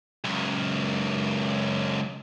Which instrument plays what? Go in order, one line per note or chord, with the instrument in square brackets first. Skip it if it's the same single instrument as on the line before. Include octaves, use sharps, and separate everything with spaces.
[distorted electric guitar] C#2 F#2